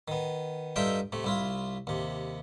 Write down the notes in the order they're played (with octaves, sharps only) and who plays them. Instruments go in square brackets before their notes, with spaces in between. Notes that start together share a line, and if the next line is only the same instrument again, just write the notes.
[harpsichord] D#3 B3
G2 D#4 F4 A4 E5 G5
C3 A3
C2 E4 F4
D#2 C3